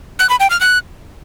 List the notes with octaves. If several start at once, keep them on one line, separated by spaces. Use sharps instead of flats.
F#6
B5
G5
F6
F#6